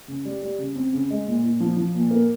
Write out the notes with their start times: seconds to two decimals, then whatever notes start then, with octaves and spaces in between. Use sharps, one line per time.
0.08 C#3
0.25 G3
0.43 G3
0.59 C#3
0.75 C4
0.93 C#3
1.10 G#3
1.27 A#2
1.43 A#2
1.60 F3
1.77 F3
1.94 A#2
2.11 A#3